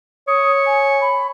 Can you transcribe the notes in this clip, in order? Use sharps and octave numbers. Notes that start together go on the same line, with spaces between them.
C#5 D#6
G#5
B5